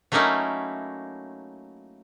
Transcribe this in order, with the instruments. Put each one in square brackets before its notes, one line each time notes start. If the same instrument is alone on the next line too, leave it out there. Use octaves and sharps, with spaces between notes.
[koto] F#3 A3 A#3 C#4 D#4 E4